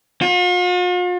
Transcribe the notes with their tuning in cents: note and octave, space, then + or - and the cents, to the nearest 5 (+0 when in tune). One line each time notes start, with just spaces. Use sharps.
F4 +45